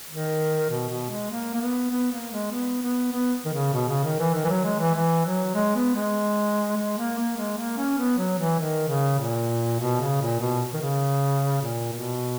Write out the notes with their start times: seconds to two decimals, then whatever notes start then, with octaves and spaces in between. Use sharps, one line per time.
0.10 D#3
0.70 B2
0.89 B2
1.10 G#3
1.31 A#3
1.54 A#3
1.61 B3
1.91 B3
2.12 A#3
2.31 G#3
2.52 B3
2.82 B3
3.12 B3
3.45 D#3
3.54 C#3
3.74 B2
3.89 C#3
4.04 D#3
4.19 E3
4.34 D#3
4.45 E3
4.49 F#3
4.64 G#3
4.80 E3
4.94 E3
5.25 F#3
5.55 G#3
5.76 B3
5.95 G#3
6.77 G#3
6.98 A#3
7.18 A#3
7.37 G#3
7.58 A#3
7.78 C#4
7.98 B3
8.18 F#3
8.38 E3
8.59 D#3
8.89 C#3
9.19 A#2
9.80 B2
10.01 C#3
10.21 A#2
10.40 B2
10.74 D#3
10.82 C#3
11.62 A#2
11.93 B2